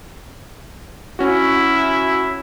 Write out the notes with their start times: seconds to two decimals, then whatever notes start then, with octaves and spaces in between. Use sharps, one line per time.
1.19 C#4 E4 F#4